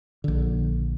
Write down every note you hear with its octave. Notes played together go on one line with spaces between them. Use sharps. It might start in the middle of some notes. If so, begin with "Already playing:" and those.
A#1 D3